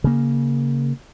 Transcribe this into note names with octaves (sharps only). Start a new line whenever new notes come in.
C#3 A#3